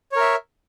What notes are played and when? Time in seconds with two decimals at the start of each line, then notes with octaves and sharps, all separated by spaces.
0.12 C#5
0.16 A#4
0.20 E5